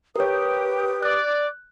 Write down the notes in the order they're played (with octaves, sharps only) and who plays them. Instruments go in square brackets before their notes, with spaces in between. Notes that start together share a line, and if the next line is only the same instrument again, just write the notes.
[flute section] G4 D#6 [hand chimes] A#4 C#5 [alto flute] B4
[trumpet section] D5 [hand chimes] F#6